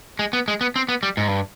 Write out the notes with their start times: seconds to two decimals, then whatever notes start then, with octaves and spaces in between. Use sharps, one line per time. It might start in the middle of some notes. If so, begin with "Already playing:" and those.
0.19 G#3
0.33 B3
0.48 G#3
0.61 B3
0.76 C4
0.89 B3
1.03 G3
1.17 G#2
1.28 G2